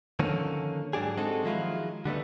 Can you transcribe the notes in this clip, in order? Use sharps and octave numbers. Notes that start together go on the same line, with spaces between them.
D3 D#3 F3 A#3 C#4
G#2 F#3 D4 G4 G#4
G#3 C4 D#4 F#4 A4
D#3 F3 F#3 G#3 E4 F4
D3 G3 A3 B3